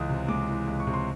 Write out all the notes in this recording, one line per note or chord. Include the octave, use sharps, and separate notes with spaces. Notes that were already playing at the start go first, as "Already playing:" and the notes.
Already playing: C#2 E3 G#3 D#6
C3
G#3 D6
E3
C#2
C#6
C3
C6